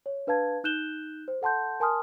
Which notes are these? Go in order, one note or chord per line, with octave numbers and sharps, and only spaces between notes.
C#5
D4 B4 F5 A5 G#6
D#4 F#6 G6 E7 G7
C5
A4 F#5 A5 C6 G6
A#4 G#5 A5 C6 D#6 F6